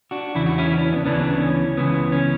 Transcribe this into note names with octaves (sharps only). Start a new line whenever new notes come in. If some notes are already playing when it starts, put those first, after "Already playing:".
D4 F#4
E2 C#3 E3 E4
F#4
C#4 E4
E4
D4
C#4
B3 D4
D2 C#3 E3 B3 D4
C#4
C#2 C#3 E3 B3
C#4